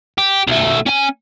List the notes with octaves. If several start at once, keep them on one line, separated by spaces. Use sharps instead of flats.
G4
B1 A3
C#4 G#5